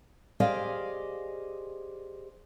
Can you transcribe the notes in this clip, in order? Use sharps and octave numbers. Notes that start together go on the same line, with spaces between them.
G4 G#4 C5 D5 D#5 F5